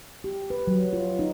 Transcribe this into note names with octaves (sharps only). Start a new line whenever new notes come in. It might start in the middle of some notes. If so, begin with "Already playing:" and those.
G4
B4
F#3
F4
D#4